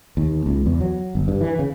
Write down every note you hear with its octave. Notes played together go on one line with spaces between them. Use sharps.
D#2
C#2
E2
F#3
G1
G2
E3
C#3